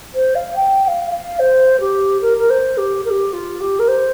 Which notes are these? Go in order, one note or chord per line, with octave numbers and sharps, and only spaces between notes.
C5
F5
G5
G5
F5
F5
C5
G4
A#4
A#4
C5
G4
A#4
G4
F4
G4
A#4
C5